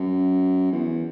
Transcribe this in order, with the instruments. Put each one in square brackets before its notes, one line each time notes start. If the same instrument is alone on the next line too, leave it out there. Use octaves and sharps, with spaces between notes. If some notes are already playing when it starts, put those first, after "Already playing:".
Already playing: [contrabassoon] F#2
E2